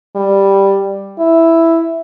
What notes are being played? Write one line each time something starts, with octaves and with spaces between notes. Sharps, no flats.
G3
E4